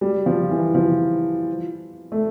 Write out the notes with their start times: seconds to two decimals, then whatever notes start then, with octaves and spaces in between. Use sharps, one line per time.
0.01 G3
0.26 F3
0.51 E3
0.75 F3
2.12 A3